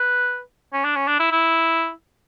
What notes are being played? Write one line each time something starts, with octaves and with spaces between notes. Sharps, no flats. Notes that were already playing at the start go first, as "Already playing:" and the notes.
Already playing: B4
C#4
D4
C#4
D4
E4
E4